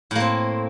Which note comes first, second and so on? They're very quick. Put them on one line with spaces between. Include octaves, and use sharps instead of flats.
A2 A#3 C4